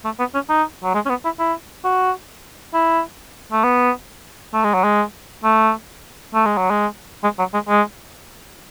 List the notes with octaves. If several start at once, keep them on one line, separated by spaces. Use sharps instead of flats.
A3
B3
C#4
D#4
F#3
G#3
C#4
B3
E4
E4
F#4
E4
A3
B3
A3
G#3
F#3
G#3
A3
A3
G#3
F#3
G#3
G#3
F#3
G#3
G#3